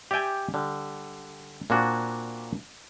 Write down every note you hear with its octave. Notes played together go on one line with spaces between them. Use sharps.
G4 D5 E5 G5 G#5
D3 G3
A#2 A#3 C4 D4 F#4